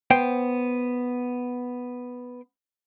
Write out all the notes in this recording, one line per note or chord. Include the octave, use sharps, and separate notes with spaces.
B3 C5 G5